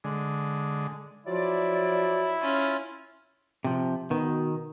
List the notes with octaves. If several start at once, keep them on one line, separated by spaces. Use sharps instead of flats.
D3 G#3
F3 F#3 E4 F4 D5
C#4 F4
C3 F3
B2 D#3